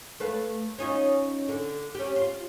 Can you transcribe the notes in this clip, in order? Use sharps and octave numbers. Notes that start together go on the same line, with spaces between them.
A3 B4 F5
C#4 D#4 F4
D3
C#4 G4
F4